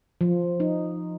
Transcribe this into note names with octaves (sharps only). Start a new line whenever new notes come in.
F3
D#4